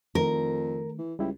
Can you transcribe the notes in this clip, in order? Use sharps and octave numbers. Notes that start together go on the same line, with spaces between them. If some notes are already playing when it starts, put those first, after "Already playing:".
F2 D#3 A3 A#4
E3
C#2 G3 E4 G4